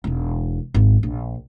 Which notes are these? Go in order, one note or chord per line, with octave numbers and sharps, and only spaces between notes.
E1 D#4
G#1
A#1